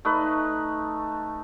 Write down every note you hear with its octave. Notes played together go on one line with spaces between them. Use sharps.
A3 D#4 B4